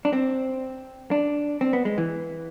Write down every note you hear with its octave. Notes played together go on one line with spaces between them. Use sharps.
D4
C4
D4
C4
B3
G#3
E3